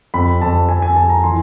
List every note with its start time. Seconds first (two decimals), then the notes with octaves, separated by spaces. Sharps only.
0.14 F2 B5
0.41 F2 A5
0.69 F2 G#5
0.82 G#5
0.96 F2 A5
1.09 A#5
1.23 E3 C6